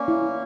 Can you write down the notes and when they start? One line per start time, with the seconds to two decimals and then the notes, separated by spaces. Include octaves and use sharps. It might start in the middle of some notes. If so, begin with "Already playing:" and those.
Already playing: A#3 C#4 D5
0.08 E4